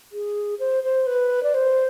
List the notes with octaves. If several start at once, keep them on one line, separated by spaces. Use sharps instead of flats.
G#4
C5
C5
B4
D5
C5